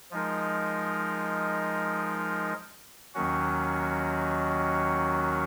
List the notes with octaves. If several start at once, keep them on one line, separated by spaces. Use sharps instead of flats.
F3 G#3 D#4 A#4
D#2 D#3 F#3 C#4 F#4